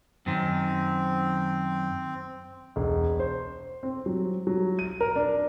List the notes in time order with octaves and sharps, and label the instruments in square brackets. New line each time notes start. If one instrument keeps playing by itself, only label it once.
[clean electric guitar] F#2 D#3 [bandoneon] C4
[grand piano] E1
C5
C4
F#3
F#3
D#7
A#4
D4